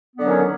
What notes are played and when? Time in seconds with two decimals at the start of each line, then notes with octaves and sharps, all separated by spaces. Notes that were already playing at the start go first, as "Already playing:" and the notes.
0.14 B3
0.18 D3
0.21 F#3
0.24 C#4
0.28 D#3